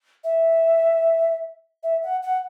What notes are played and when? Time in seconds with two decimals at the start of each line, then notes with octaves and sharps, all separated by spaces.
0.24 E5
1.83 E5
2.03 F#5
2.23 F#5